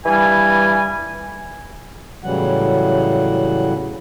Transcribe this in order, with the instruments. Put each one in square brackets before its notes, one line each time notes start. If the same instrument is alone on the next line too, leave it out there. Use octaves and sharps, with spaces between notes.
[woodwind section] G2 E3 G3 G#5
[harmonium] A2 C#3 E3 F#3 G3 F#5